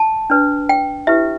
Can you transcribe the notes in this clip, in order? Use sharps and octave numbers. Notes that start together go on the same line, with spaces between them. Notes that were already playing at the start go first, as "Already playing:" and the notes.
Already playing: A5
D4 B4
G5
E4 G4 B4 E5